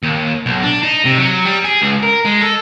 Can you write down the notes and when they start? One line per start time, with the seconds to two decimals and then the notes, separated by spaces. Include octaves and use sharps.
0.03 D#2
0.46 B1
0.63 D4
0.83 D#4
1.05 C3
1.18 F#3
1.45 G3
1.65 G#4
1.82 C#2
2.03 A#4
2.25 G#3
2.41 A4